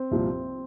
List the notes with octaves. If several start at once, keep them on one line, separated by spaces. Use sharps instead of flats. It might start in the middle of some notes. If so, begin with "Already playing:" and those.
Already playing: C4
C2 A#2 F3